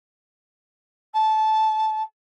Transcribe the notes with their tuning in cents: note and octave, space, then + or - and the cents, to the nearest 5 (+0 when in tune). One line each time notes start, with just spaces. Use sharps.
A5 -15